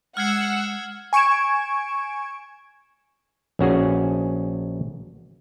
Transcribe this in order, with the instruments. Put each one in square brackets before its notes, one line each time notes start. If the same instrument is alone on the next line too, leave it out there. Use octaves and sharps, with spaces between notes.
[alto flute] G#3 [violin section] F#5 E6 [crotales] F6 G#6 C7
[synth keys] G#5 C#6 G#6 D7 E7
[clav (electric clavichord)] A#1 C#4 F#4 G#4